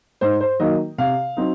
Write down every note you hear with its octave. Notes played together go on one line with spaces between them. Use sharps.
G#2 C5
C5
D#3 F#3 A#3 D#4 D#5
C3 F5
F#3 C4 D#4